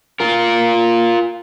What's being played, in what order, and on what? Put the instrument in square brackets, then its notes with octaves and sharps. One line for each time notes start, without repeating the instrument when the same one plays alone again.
[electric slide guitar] F4 A#4